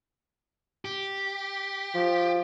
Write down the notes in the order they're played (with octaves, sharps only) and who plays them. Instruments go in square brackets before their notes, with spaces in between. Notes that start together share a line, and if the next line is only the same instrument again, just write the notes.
[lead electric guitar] G4
[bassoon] F3